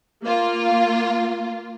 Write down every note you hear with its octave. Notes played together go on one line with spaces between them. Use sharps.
A#3 F4